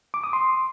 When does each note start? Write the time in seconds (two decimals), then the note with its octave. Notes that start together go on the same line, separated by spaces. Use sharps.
0.14 D6
0.24 D#6
0.33 C6